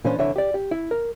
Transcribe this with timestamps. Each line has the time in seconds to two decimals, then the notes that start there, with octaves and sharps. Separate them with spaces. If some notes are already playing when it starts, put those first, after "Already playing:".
0.05 A#2 E3 A#3 C#4 D4 C5
0.18 C2 D3 E3 D4 C#5 E5
0.36 G4 D5
0.54 G4
0.71 E4
0.91 A#4